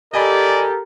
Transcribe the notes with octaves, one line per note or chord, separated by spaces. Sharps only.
G4 A4 A#4 D5 D#5 G#5 B5